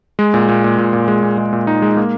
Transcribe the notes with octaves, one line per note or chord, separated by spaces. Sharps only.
G#3
A#2
A#2
A#2
A#2
A#2
G#3
A#2
G#3
A#2
D#4
G#3
A#3